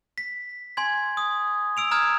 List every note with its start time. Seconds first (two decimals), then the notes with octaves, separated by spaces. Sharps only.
0.18 B6
0.77 G#5 C6 G#6
1.17 D#6
1.77 E6 D7 F7
1.91 A#5 D#6 F6 G#6